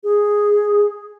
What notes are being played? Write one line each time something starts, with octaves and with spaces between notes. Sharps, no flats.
G#4